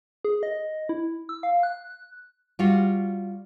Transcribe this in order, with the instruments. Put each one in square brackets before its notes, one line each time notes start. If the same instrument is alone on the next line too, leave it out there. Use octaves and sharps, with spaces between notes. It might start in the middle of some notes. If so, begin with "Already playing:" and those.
[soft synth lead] G#4
D#5
E4
E6
F5
F#6
[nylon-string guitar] G3 F4 F#4